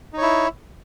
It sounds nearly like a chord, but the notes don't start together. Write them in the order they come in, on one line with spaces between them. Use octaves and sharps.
D#4 C#5 E4